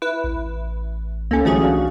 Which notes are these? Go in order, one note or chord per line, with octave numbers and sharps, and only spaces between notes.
E4 B4
A1
C2 A#3 C#4 A4
E3 F#3 G3 A3 C#4 G#4
D4 F#4 F5